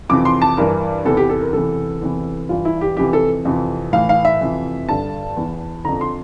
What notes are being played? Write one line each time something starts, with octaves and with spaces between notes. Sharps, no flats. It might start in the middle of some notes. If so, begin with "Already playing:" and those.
F2 C3 E3 D6
C6
A5
G2 E3 A#4
E2 C3 E3 A4
G4
A4
A#4
E2 C3 E3 A4
E2 C3 E3
G2 E3 F4
E4
G4
F2 C3 E3 G4
A4
F2 C3 E3
A2 E3 F5
F5
E5
F2 C3 E3
G2 D3 A5
E2 E3
F2 D3 A#5
C6